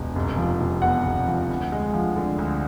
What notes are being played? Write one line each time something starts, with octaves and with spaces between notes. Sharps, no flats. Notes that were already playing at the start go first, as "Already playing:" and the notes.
Already playing: E1
F1
F3
C3
E2 F#5
F1
F3
D2
G#3
F3
D3
D2